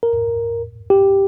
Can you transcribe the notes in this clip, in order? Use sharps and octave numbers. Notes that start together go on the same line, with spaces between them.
A#4
G4